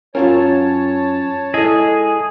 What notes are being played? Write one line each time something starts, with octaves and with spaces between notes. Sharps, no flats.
F#2 C#4 F4 A#4 C#5 A5
G#3 E4 G#4 A4 D#5